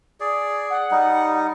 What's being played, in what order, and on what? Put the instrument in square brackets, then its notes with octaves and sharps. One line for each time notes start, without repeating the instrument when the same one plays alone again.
[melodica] G#4 D5
[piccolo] F#5
[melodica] G3 D#4